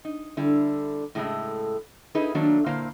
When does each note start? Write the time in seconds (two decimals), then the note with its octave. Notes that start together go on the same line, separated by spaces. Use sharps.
0.05 D#4
0.37 D3 G3 E4
1.15 A2 C#3 G#3 A3 E4
2.15 D#4 E4 G#4 B4
2.35 D#3 F#3 A3 A#3 D4
2.66 A#2 D3 A#3 E4 C5 F5